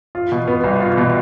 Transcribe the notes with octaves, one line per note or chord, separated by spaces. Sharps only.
F4
B2
B3
C2
F4
B2